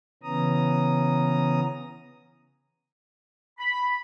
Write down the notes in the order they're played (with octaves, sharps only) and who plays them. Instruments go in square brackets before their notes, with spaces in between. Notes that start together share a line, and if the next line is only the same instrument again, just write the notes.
[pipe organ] C#3 E3 B3 C#4 A#5 D#6
[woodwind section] B5